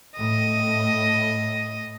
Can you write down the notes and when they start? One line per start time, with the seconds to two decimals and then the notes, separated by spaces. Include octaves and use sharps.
0.18 A2 D#5